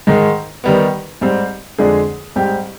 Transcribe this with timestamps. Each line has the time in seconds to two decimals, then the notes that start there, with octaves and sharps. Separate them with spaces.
0.07 G#2 D#3 G#3
0.64 D#3 G3 B3
1.21 G#2 G3 C4
1.78 F2 D3 G#3 D4 G#4
2.36 G#2 G3 C4 G4